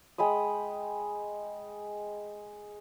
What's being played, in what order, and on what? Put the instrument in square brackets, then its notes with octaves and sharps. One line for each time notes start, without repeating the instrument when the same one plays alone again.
[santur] G#3 G5 B5 D#6